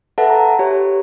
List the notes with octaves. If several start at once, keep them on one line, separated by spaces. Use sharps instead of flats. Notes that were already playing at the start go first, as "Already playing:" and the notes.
A4 B4 E5 F#5 A5
A#5
G4 C#5